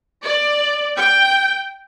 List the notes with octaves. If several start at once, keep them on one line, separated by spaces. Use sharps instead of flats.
D5
G5